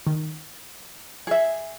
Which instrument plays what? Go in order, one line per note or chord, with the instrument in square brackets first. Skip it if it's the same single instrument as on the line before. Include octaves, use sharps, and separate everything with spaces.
[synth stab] D#3
[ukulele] G#4 E5